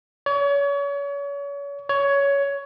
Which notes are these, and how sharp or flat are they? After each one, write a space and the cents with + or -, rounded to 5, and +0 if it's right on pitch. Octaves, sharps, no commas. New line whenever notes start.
C#5 +35
C#5 +15